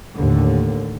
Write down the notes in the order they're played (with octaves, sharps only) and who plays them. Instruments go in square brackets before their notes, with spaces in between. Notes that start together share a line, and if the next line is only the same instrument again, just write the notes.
[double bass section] D#2 A2 D3